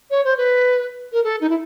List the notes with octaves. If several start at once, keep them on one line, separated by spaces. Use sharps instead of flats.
C#5
C5
B4
A#4
A4
D#4
E4